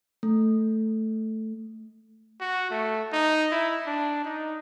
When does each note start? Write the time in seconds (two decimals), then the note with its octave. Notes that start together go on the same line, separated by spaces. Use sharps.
0.23 A3
2.41 F#4
2.70 A3
3.12 D#4
3.51 E4
3.86 D4
4.24 D#4